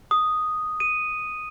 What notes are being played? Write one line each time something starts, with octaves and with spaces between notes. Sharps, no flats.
D#6
D#7